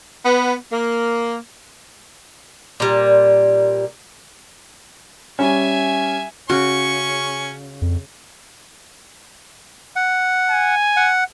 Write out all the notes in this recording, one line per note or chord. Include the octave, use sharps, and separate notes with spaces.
B3
A#3
A#2 G3
G3 C#4 E5 G#5
C#3 C#4 F#4 C#6
F2
F#5
G#5
F#5